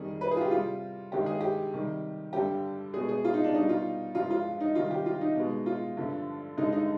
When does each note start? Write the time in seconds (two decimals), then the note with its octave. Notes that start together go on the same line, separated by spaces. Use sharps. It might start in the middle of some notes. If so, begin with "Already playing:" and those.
Already playing: F2 D#3 G3 G#4
0.21 B4
0.31 G#4
0.37 F4
0.41 G4
0.51 C3 G3 F4
1.12 G2 D#3 G#3 G4
1.26 G#4
1.41 G4
1.73 C3 D#3 G3
2.33 G2 D3 G3 G4
2.93 B2 G#3 G#4
3.09 G#4
3.25 F4
3.34 D#4
3.44 D4
3.54 B2 G3 D#4
3.69 F4
4.15 G2 F3 G#3 F4
4.30 F4
4.60 D#4
4.75 C3 D#3 G3 F4
4.91 G4
5.06 F4
5.21 D#4
5.36 B2 G#3
5.66 F4
5.97 G2 D3 F3
6.57 G2 D3 G#3 D#4
6.72 D#4